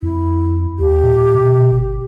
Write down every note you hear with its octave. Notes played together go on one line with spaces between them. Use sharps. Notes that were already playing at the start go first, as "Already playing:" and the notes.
F2 E4
D#2 G4
A#2
B2
G1